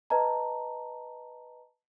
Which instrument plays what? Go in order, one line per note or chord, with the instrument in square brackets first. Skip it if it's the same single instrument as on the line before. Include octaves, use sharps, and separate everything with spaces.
[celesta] B4 D#5 A5 A#5